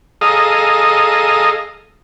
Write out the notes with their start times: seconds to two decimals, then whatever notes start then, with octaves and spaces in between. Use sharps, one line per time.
0.21 G#4 A4 D#5 F5 A#5 D#6